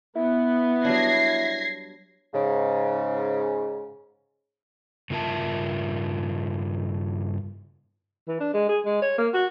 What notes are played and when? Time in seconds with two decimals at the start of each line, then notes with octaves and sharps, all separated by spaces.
0.16 B3 E4
0.85 F#3 G3 D4 G#6 A#6 C7
2.34 G#2 C#3
5.10 G2 C#3 F4 A#4 E5 A5
8.28 E3
8.40 D4
8.54 G#3
8.69 G#4
8.85 G#3
9.02 C#5
9.18 A#3
9.34 F#4